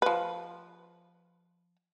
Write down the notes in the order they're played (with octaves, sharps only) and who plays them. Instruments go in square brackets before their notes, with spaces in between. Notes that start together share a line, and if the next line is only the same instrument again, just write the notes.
[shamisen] F3 B4